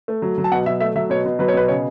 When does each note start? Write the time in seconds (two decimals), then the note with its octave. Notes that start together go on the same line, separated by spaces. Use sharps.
0.08 A3
0.22 F#3
0.38 F#3
0.44 A5
0.52 B2 F#5
0.66 F#3 E5
0.80 A3 E5
0.95 F#3 E5
1.10 B2 C#5
1.26 B2
1.39 F#3 B4
1.48 C#5
1.54 B2 B4
1.68 C#3 C#5